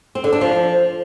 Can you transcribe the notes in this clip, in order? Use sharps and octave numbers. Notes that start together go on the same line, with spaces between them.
C4
D3
D4
F3